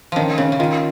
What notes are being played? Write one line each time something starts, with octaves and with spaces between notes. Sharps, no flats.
D#3 F3 C#4
C#3 C#4
C#3
D#3 F4